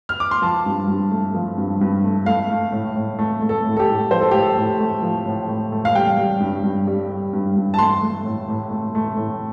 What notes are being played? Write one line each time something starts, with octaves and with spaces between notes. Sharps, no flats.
F6
D6
C6
F3 A5
G2
G2
A3
F3
G2
G2
A3
A3 F5
A3
A2
A2
A3
A3
A4
A2
A4
G4
A2
F3 C5
A4
A2 G4
A4
A2
A3
F3
A2
A2
A3
F5
G3 G5
G3
G2
G2
G3
G3
G2
G2
A5
A3 C6
A3
A2
A2
A3
A3
A2